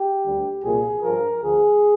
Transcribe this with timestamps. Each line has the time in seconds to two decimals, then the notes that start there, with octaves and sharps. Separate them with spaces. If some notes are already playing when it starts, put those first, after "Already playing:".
Already playing: G4
0.25 D2 D3 G3
0.64 C2 A#2 F3 G#4
1.03 G2 F3 A#4
1.43 D2 D3 F3 G#4